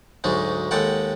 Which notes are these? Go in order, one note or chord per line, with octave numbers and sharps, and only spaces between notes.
D2 G#2 F#3 G#3 D#4
D#2 G#3 A4 F#5 G5 B5